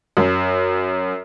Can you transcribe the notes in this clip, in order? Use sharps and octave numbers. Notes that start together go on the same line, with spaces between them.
F#2